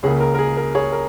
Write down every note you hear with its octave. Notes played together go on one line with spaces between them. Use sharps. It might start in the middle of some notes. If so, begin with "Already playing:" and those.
C#2 C#3 A#3 G#4 C#5
A#4
A#4
G#4
A#4
G#4 C#5
A#4